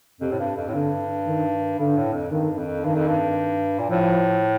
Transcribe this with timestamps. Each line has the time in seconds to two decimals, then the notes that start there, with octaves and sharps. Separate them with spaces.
0.21 F2 C3
0.32 A2
0.39 G2
0.56 F2
0.69 A2
0.74 G2 D3
1.27 D#3
1.79 G2 D3
1.97 A2
2.14 F2
2.32 G2 D#3
2.58 F2
2.85 G2 D#3
2.96 F2
3.08 G2
3.79 A#2
3.90 A2 F3